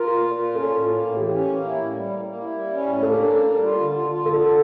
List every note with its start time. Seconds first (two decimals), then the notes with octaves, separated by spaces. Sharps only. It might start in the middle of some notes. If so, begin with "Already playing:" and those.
Already playing: F4 A#4
0.08 A#2
0.23 A#2
0.40 F4
0.55 C#4 A4
0.71 A2
0.85 A#3
1.02 A2
1.16 E3 G4
1.32 C#4
1.48 A#3
1.64 E4
1.78 A2
1.94 G3
2.09 A#3
2.25 A#3
2.40 E4
2.55 G3
2.71 C#4
2.87 A2
3.03 A#3 A4
3.18 D4
3.32 A#3
3.48 G3
3.63 F4
3.79 D3
3.94 F4
4.10 F4
4.25 D3 A4
4.41 D4